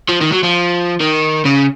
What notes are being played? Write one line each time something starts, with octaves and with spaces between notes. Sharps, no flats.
F3
D#3
F#3
F3
D#3
C#3